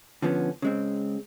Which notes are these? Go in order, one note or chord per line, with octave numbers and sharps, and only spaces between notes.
D3 F3 B3 C#4
C#3 G#3 C4